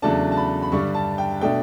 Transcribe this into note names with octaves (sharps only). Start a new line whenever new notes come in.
E2 C#3 F#3 A3 D4 A5
A5
B5
B5
G2 D3 G3 D4 C#6
A5
G5
B2 A3 D4 G5